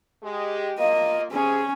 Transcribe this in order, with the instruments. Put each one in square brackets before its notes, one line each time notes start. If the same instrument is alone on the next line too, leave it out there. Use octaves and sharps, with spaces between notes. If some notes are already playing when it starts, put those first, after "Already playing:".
[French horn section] G#3 G4
[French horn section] A#3 F4 [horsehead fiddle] D#5
[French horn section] C3 G#4 [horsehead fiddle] C#4